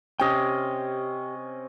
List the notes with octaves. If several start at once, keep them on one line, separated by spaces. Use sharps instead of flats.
C3 C#4 G4 D#5 G5